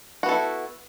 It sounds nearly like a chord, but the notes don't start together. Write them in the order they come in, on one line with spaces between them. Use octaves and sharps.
F#4 B3 A4 E4